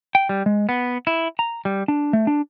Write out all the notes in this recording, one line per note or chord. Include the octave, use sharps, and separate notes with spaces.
G5
G3
G#3
B3
E4
A#5
G3
D4
A3
D4